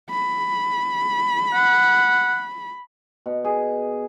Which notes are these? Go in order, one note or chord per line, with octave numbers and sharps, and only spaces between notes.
B5
F#5
B2
G#4